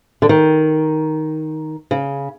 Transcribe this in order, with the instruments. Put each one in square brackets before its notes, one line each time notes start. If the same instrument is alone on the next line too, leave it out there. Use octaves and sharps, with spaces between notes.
[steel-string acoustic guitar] D3
D#3
C#3